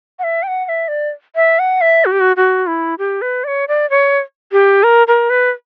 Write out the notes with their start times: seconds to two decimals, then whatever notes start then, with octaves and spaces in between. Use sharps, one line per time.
0.19 F#5
0.24 E5
0.43 G5
0.48 F#5
0.65 F#5
0.69 E5
0.88 D5
1.35 E5
1.59 F#5
1.81 E5
2.05 F#4
2.12 G4
2.20 F#4
2.36 F#4
2.67 E4
2.98 G4
3.22 B4
3.44 D5
3.48 C#5
3.68 D5
3.90 C#5
4.52 G4
4.83 A#4
5.07 A#4
5.30 B4